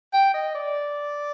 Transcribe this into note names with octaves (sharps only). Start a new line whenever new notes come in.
G5
D#5
D5